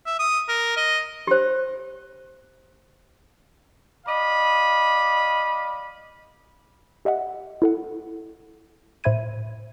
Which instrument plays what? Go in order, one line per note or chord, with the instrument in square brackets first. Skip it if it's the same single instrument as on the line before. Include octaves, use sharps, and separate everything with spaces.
[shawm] E5
D#6
A#4
D#5
[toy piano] G4 C5
[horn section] D5 D#5 F5 B5
[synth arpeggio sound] G4 D#5 E5 F#5
E4 A4 F#5
A2 C5 E5 B5 G#6 D#7